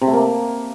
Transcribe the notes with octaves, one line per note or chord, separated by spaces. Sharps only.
C3
A3
A#3